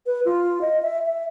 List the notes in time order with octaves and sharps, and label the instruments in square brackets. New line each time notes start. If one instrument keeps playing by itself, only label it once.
[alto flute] B4
F4
D#5
E5
E5